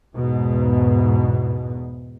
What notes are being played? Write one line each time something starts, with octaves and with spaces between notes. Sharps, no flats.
E2 G#2 B2